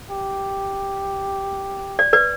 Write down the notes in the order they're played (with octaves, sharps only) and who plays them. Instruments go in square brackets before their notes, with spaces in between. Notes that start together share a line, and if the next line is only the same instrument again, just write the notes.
[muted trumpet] G4
[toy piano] D5
B4 D5